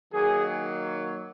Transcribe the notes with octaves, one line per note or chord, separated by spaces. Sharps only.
D#3 F#3 A#3 G#4